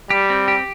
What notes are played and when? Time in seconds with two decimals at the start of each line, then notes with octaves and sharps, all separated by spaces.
0.10 G3 G4
0.30 C4
0.48 G4